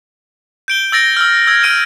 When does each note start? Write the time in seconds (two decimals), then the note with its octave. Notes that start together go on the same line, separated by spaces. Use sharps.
0.68 G6 D7 G7
0.92 E6 A6 A#6 D7
1.17 E6 F6
1.47 E6 G#6
1.63 F6 D7 D#7